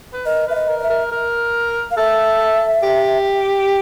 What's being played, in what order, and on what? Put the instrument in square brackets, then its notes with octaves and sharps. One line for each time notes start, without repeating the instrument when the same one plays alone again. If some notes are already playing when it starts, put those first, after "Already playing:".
[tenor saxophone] B4
[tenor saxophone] A#4 [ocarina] D#5
[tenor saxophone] B4 [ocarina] E5
[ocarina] D#5
[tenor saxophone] A#4
[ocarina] D#5
E5
[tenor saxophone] A#4
A#4
[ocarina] F5
[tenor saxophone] A4 [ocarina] E5
[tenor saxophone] G4